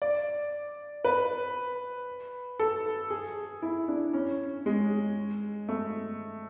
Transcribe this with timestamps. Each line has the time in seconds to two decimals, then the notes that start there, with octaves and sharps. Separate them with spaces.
0.02 D5
1.04 B4
2.59 A4
3.10 G#4
3.62 E4
3.88 D4
4.13 C#4
4.66 G#3
5.69 A3